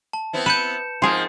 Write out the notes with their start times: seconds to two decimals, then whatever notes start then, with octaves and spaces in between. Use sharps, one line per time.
0.13 A5
0.33 B3 C4 E4
0.46 B4 G6 C#7 E7
1.02 G#2 F3 C4 F4 G#4 A#4